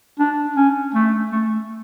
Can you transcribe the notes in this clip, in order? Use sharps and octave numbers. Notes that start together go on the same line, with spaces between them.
D4
C#4
A3
A3